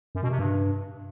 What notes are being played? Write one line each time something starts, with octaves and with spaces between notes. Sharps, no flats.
F#2
B2
C3
G2